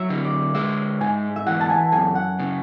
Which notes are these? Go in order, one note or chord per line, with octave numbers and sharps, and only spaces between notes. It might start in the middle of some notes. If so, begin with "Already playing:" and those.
Already playing: F#3 E5
D3
D5
G#3 E5
G#2 G#5
E5
E3 F#5
A5
G#5
F#2 G#5
F#5
C#3